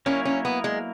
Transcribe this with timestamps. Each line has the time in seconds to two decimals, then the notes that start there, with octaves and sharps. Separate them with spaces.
0.06 F#3 A#3 C#4 E4 A#4 C#5
0.25 C#4
0.45 B3
0.64 G#3